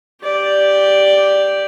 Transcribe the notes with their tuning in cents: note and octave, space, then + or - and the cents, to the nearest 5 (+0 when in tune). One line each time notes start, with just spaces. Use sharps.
G4 +0 D5 +0